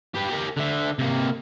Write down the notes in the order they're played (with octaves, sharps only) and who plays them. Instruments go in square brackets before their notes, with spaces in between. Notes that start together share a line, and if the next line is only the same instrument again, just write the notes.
[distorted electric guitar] G4 B4
G4 A#4
D3 E5
C3 A#3